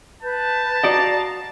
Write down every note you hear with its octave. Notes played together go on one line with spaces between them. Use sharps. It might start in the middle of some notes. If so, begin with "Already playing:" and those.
B4 A5 G6
F#4 D5 D#5 F5 A#5 D#6